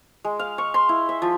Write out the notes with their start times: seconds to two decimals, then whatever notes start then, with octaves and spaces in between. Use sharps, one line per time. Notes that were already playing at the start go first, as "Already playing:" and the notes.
0.25 G#3
0.39 F5
0.58 C#6
0.74 C6
0.89 E4
1.09 E5
1.22 F3